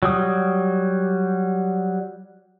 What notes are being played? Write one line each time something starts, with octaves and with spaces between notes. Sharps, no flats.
F#3 G3 D#6